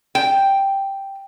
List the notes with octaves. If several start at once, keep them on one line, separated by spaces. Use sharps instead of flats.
G5